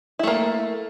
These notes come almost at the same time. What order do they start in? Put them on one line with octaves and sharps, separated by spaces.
E4 A3 A#3